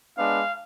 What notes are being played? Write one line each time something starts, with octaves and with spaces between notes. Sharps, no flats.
G#3 B3 D4 F5